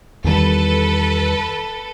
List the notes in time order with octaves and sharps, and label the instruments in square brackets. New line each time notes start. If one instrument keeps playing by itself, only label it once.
[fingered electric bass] E2 D#3 G3 [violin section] A4 B4